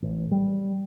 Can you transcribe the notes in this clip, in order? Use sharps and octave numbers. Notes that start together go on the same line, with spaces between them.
A1
G3